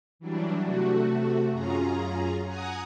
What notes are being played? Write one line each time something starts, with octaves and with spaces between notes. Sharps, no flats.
E3 F#3 G3 D4
C3 A3 F#4
F#2 C#4 F4 G#4 A#5
F#5 G#5 A#5 D#6